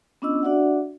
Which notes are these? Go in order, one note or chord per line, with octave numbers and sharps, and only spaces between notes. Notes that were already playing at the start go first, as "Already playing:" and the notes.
B3 C#4 D4 F4 D#5 E6
D4 F#4 D5 E5 F#5